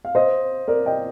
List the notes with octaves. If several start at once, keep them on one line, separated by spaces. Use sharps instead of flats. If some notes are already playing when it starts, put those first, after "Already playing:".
F5
C5 D#5
A#4 D5
D#5 G5